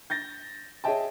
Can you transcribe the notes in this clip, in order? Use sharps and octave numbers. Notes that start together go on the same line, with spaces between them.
G6 A6 A#6
G#4 C#5 D#5 E5 G5 A5